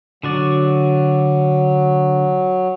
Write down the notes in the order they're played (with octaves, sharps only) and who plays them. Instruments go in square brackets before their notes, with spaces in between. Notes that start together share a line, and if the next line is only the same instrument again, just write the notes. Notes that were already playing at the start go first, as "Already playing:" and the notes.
[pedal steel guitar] D3 F#4 D5 [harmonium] F#3